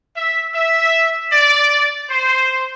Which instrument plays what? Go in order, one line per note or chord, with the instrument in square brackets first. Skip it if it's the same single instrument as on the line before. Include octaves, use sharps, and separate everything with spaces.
[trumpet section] E5
E5
D5
C5